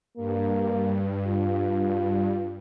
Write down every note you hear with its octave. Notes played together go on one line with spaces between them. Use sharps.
G2 A#3
F4